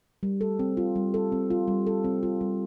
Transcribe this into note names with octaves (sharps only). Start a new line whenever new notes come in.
G3
A4
C4
F4
G3
A4
C4
F4
G3
A4
C4
F4
G3